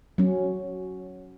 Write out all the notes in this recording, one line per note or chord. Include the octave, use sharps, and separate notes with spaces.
F#3 C#4